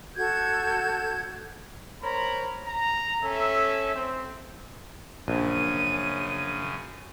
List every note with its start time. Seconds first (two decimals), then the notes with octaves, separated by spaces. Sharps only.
0.16 F#4 A4 G6 G#6
2.02 A#4 C5 C#5 A#5 B5
2.65 A#5
3.23 C#4 A4 E5
3.94 C4
5.28 A#1 F#2 C#3 D#7